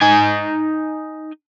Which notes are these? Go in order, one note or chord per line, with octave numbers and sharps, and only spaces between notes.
D#4 G#5